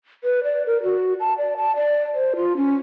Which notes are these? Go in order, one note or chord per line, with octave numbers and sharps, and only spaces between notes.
B4
D5
A#4
F#4
A5
D5
A5
D5
C5
F4
C#4